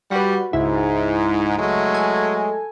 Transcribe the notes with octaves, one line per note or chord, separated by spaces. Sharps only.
G3 F#4 B4
C#2 G#2 E4
F#3 G#3 A3
A4 G#5